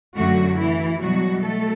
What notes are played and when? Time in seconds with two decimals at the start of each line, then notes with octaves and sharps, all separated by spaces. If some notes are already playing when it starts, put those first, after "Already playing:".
0.16 F#2 D3 F#3 A3 F#4
0.58 E3 E4
1.01 B2 F#3 G3 F#4
1.44 A3 A4